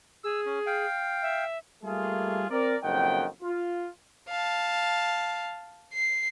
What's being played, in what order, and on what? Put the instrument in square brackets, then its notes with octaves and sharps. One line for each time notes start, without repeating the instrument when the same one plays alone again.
[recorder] G#4 [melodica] E6
[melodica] C#4
F5 G5
[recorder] E5
[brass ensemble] G3 A3 A#3 F4 G#4
C4 A#4 D5
F#1 F2 D#3 F#5 G5
F4
[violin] F5 A5
C7